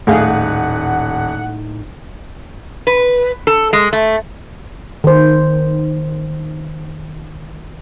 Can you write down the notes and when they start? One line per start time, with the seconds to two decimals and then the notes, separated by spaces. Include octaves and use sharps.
0.07 D#1 A2 A3 D#4 G#4 F5 F#5
2.87 B4
3.47 A4
3.73 G#3
3.93 A3
5.04 D#3 C5